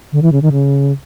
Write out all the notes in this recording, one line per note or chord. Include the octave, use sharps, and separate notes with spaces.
D3
E3
C#3
D#3
C#3